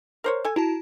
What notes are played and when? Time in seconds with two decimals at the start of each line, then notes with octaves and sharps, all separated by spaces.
0.24 A#4 C5 C#5
0.44 A4 G#5
0.56 E4 F#4 A5 A#5